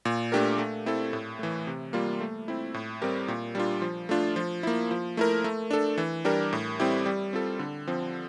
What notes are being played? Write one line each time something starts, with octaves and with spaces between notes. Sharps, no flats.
A#2
A3 D4 G4 A#4
A3
C4 E4 A4
A2
E3 A3
C3
G3 A#3 F4
A3
C4 E4
A2
G3 C4 G4 A#4
A#2
G3 D4 F4
F3
A3 D4 F4
F3
A#3 E4
F3
A3 E4 A#4
A3
D4 A4
E3
G3 D4 G4 A#4
A2
G3 C4 E4 G4
G3
C4 F4 A4
D3
F3 C4